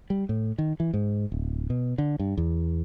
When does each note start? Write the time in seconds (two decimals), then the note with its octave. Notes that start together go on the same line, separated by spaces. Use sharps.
0.10 G3
0.29 A2
0.58 D#3
0.80 E3
0.94 G#2
1.32 D1
1.70 B2
1.98 D3
2.19 G2
2.37 E2